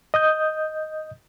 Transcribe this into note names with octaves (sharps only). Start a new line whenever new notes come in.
D#5 D#6 G6